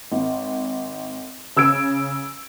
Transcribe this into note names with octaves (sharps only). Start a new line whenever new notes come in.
G#1
C#3 E6 G#6 D7